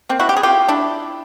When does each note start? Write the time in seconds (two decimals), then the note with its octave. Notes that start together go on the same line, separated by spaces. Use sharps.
0.09 A#3 C4
0.19 E4 F#4
0.29 G4
0.37 G#4
0.43 F4 G4
0.68 D4 E4